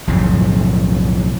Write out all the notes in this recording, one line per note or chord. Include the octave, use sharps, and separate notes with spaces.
B1 F2 A2 C#3